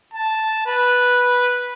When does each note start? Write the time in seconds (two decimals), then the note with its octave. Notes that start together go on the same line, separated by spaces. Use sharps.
0.14 A5
0.67 B4